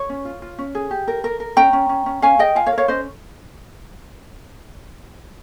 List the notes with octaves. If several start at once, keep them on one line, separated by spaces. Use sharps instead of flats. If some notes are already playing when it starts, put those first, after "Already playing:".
Already playing: C#5
C#4
F4
F4
C#4
G#4
G4
A#4
A#4
A#4
C#4 G5 A#5
C#4
C#4
C#4
C#4 F5 G#5
G#4 D#5 G5
F4 F5 G#5
C#5 F5
A#4
C#5 F5
C#4 C5 D#5